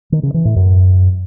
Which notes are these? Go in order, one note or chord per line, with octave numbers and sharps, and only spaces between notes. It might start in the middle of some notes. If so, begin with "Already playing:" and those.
D#3
C#3
E3
A2
F#2